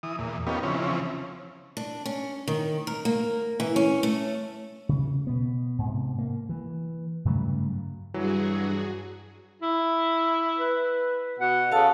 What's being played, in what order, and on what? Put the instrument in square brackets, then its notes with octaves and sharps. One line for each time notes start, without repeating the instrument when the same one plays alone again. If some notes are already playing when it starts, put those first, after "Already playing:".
[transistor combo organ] E3 D#6
E2 A#2
A#3 B3 C#4 D#4 F4 G4
C#3 E3 F3 C4 C#4
[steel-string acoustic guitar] D4
C#4
D#3
A#4
A#3
E3
C#4
A3
[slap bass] C#3
B2 B3
G#2 C3
A#3
E3
G2 C#3 F#3 A3
[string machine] G2 F#4 G#4 [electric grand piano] E3 F#3
[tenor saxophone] E4
[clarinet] B4
[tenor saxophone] B2 [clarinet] F#5
[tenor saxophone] C#3 [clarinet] A4 [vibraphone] F5 A5